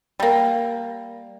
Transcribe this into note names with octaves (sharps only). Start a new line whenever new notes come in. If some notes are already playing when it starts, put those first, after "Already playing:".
G3 A#3